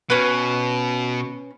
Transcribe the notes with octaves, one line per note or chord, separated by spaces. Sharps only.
B2 C#4 B4